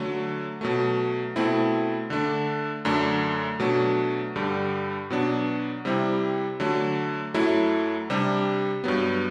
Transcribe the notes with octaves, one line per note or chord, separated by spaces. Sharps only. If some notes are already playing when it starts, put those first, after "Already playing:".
Already playing: D3 F#3 A3
B2 F#3 A3
B2 A3 C4 E4
D3 A3 D4
F#2 D3 A3 D4
B2 F#3 A3 D4
G2 D3 G3
B2 F#3 B3 D4
C3 G3 C4 E4
D3 F#3 A3
F#2 F#3 A3 E4
C3 G3 D4
G2 F#3 B3